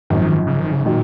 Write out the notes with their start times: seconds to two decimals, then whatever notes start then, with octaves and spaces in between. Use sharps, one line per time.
0.10 G#1 F#2 D#3 F3
0.47 C#3
0.59 D#3
0.72 C#3
0.85 A#2 D#3 F#3